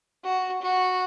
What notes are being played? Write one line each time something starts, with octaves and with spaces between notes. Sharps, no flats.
F#4
F#4